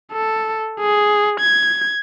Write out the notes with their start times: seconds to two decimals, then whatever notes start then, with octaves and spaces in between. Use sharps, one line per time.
0.12 A4
0.80 G#4
1.40 G#6